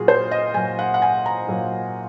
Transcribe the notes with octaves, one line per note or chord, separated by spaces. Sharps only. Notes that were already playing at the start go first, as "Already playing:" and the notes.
Already playing: A#2 F#3 F4 F#4 G#4
C5
D#5
A#2 F#3 G#5
F#5
F#5
G#5
A#5
A#2 F#3